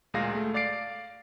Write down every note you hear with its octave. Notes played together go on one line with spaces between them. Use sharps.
D2 A#2 G#3 G#4 F5 A#6
A3
D5 F5 D6 A6 C7 D7